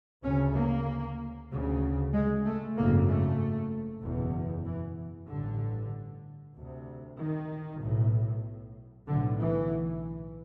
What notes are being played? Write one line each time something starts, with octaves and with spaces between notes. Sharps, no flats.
D2 C#3 C#4
A#3
D2 C#3
G#3
A3
G#1 F#2 C#3 A#3
A3
F#1 E2 B2
E3
A1 G2 D3
D2 C3
D#3
B1 A2
B1 A2 D3
E3